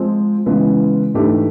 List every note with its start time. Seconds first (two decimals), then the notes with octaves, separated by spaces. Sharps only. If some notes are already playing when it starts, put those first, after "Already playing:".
Already playing: F3 G#3 C4
0.46 C#3 E3 G#3 B3
1.14 G#2 E3 A3 D4 G4